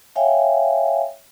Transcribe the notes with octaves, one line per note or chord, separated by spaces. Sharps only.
C#5 E5 F5 G5 G#5